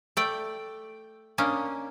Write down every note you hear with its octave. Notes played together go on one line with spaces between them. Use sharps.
A3 D5 G5
A#3 C#4 D4 D#5